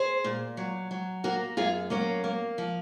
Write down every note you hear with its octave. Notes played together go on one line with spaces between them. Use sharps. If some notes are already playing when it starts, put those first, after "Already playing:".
Already playing: G#4 C5
A#2
F#3
F#3
A#3 F#4 A#4
F#2 F4 G#4
F#3 A#3 C#4
A#3
F3